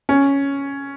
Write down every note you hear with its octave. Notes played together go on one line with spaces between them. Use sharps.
C#4